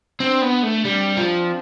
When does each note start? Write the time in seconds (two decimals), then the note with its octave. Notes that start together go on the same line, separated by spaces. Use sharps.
0.20 C4 D4
0.42 B3
0.64 A3
0.85 G3 C4
1.17 F3